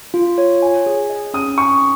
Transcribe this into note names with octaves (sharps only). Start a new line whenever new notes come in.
F4
C#5
G#5
G#4
D#5
C#4 D#6
G#5 C#6